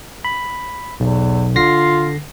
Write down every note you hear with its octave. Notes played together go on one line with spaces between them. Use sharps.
B5
B1 E2
D3 F4 A#6 C7